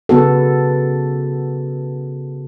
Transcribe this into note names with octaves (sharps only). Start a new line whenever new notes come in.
C#3 B3 F#4 A4